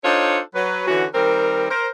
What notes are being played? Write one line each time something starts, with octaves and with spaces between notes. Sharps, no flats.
D4 D#4 F4 A4 C5 C#5
F#3 B4
D3 E3 C#4 F#4
D#3 G3 C4 A#4
A#4 C5